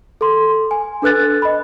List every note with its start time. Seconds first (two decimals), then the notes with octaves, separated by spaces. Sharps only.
0.21 A4 C6
0.71 G#5
1.02 D4 A4 B4 F#6 A6
1.42 D#5 B5